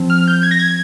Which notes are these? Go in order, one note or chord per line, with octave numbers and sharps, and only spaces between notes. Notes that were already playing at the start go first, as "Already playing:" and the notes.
Already playing: F3 C4
F6
G6
G#6
A#6
G#6